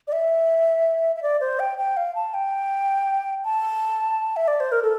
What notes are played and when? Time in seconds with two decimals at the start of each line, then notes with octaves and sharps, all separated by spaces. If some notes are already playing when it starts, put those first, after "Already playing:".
0.08 D5
0.12 E5
1.16 E5
1.23 D5
1.41 C5
1.59 G5
1.78 G5
1.97 F5
2.15 A5
2.34 G5
3.45 A5
4.36 E5
4.48 D5
4.60 C5
4.72 A#4
4.83 A4